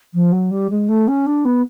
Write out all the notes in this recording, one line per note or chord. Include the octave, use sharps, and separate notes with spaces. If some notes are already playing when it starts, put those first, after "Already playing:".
F3
F#3
G3
G#3
A3
C#4
D4
B3